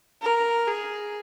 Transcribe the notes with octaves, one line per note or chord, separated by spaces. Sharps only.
A#4
G#4